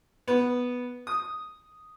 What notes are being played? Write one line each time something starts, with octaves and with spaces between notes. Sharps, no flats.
B3
D#6